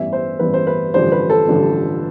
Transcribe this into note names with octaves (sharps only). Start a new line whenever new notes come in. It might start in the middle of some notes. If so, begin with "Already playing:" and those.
Already playing: A1 G2 E3 B3 E5
C5
A1 G2 E3 B3 B4
C5
B4
A1 G2 D3 F3 C5
B4
A4
A1 G2 D3 F3